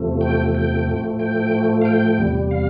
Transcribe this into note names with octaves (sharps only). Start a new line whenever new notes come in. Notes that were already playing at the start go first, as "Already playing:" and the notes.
Already playing: E2 C3 F3 A3
G5
G5
A2 F3 A3
G5
F5
G5
E2 C3 G3
F5